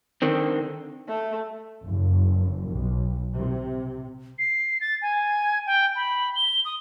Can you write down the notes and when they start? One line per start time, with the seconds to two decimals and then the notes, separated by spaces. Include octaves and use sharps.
0.22 D3 D#3 C4
1.08 A3
1.86 F#1
2.70 B1
3.36 C3
4.39 C7
4.81 A6
5.02 G#5
5.66 G5
5.96 B5
6.36 G7
6.65 D#6